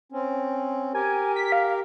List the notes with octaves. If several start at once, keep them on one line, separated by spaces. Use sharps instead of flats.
C4 C#4
G4 A#4 G#5
B6
F5